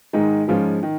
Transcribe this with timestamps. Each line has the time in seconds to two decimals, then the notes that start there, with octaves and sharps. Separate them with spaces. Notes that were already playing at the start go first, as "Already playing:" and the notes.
0.13 G#2 D#3 G#3 D#4
0.48 G#2 F3 G#3 C#4 F4
0.83 D#3